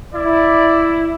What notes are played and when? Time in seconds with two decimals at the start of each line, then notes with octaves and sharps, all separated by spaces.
0.14 E4 D5